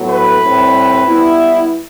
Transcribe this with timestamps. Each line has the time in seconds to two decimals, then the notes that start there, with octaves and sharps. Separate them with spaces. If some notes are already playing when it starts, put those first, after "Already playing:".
Already playing: A2 F#3 B3 F#4 A4
0.09 B4
0.42 A2 G3 C4
1.05 G3 B3 E4